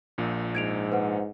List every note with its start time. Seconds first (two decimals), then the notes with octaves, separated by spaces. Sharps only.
0.18 A#1 A#2
0.55 G#2 G#6 D7 F7
0.92 B4 C5 F#5